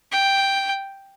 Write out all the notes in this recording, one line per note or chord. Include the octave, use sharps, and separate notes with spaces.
G5